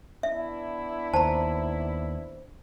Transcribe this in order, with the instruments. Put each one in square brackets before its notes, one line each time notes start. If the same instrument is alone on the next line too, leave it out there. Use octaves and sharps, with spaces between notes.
[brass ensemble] B3 D4 E4 [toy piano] E5
[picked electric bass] D#2 [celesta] C5 [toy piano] A5 A#5